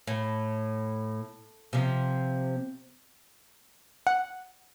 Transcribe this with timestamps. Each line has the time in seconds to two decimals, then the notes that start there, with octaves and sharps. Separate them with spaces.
0.07 A2
1.73 C3 F3
4.07 F#5